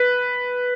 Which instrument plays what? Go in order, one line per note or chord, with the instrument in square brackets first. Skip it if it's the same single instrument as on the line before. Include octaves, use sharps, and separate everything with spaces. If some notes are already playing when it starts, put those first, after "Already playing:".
Already playing: [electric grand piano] B4